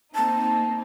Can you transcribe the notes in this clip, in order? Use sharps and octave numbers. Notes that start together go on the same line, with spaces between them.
A#3 C4 D#4 A5